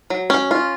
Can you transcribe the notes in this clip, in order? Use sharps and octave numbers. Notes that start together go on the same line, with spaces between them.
F#3
C#4
F4